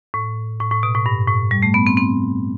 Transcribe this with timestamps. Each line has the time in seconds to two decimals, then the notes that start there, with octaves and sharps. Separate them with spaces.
0.14 A2
0.60 A2
0.71 A2
0.83 B2
0.94 A2
1.06 G2
1.28 A2
1.51 G3
1.63 A3
1.74 B3
1.87 C4
1.97 C4